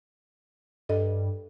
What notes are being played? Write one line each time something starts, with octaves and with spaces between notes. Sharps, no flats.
G2 A4 D#5